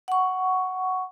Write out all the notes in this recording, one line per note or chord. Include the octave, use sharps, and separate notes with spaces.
F#5 C#6